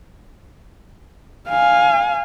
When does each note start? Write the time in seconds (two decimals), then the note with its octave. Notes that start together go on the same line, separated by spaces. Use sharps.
1.49 F5 G#5